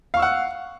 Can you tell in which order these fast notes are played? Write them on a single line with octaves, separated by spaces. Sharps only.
F5 C#6 E6 F#5